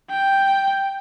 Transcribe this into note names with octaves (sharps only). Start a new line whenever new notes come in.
G5